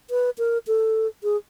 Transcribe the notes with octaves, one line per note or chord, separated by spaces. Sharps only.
B4
A#4
A4
G#4